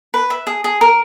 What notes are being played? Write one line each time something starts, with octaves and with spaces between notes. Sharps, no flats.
B4
E5
G#4
G#4
A#4